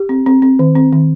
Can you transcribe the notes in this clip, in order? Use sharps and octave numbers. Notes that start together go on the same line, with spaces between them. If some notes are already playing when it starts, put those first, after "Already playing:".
Already playing: G4
C4
C4
C4
D#3
C4
D#3